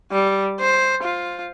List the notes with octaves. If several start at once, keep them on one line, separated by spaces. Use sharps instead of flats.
G3
C5
F4